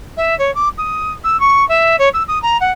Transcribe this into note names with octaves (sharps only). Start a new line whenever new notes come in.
E5
C#5
D6
D#6
E6
C#6
E5
C#5
E6
D#6
A#5
F#5